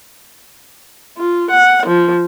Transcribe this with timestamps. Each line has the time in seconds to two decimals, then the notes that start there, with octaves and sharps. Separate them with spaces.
1.17 F4
1.51 F#5
1.86 F3